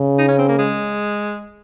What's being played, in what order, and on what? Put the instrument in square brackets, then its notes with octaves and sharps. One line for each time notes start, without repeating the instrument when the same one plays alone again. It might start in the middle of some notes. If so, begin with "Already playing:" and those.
Already playing: [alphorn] C#3
[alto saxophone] D#4
C#4
C4
A#3
G#3